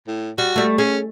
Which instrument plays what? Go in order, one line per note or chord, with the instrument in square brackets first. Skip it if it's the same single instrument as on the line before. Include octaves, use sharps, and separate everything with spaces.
[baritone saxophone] A2
[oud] G3 [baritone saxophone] F#4
[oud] G3 A3
[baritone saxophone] C#4 [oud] G#4